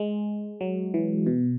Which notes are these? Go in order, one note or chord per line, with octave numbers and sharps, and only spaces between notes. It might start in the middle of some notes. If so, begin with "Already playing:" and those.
Already playing: G#3
F#3
E3
B2